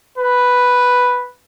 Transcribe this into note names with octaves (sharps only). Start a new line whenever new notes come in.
B4